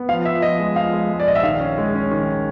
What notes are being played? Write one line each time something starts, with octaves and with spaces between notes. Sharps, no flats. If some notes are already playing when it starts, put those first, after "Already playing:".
Already playing: B3
F3 F5
F3 E5
F3 D#5
G#3
F3 F5
G#3
G#3
D5
A#1 D#5
E5
D#3 F5
C#4
G#3
C#4
D#3